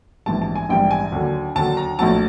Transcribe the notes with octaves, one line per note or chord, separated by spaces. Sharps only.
A#1 G#2 E3 G3 A5
A5
G#5
A#1 G#2 E3 G3 G5
G#5
D#2 D3 F#3
D#2 D3 F#3 A5
A#5
A#1 A2 F#3 A5